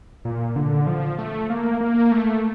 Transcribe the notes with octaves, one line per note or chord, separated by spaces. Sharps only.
A#2
D3
F3
A3
A#3
A#3
A3